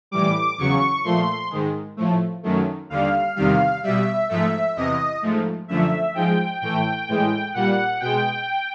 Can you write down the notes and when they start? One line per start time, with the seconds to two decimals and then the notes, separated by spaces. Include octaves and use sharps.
0.11 A2 E3 G3 D6
0.58 E2 C#3 F#3 C#6
1.04 A#2 F3 A3 C6
1.50 G#2 D#3 G#3
1.97 A2 F3 A3
2.43 F#2 D#3 F#3 A3
2.90 D#2 D3 G3 F5
3.36 E2 C3 D#3 G3 F5
3.83 B2 G3 E5
4.29 G#2 F3 A3 E5
4.76 E2 C3 E3 D#5
5.22 G#2 F3 A3
5.68 F#2 D3 F3 A3 E5
6.15 G#2 F3 G#3 G5
6.61 A2 E3 A3 G5
7.08 A2 E3 G#3
7.54 A#2 G3 F#5
8.00 B2 G#3 G5